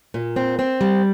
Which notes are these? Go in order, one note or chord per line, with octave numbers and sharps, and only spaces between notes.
A#2
C4
C4
G3